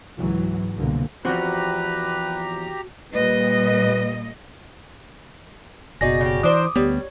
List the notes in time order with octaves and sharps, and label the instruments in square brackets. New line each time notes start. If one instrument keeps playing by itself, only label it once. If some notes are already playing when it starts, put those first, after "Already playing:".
[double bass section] C#2 G#2 E3 F#3
C2 B2 D3 A#3
[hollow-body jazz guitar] E2 F3 C4 [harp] F#4 [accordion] G4 A#5 [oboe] B4
[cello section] A#2 G3 D#5 [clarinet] B4
[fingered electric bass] F#1 B2 [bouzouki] D#4 G#4 [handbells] F#4 D5 A#6
[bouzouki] C#3 G4
[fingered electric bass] E3 [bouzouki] D4 A#4 C5 [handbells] D6 D#6
[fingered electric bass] D2 B3 [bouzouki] G3 [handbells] C#5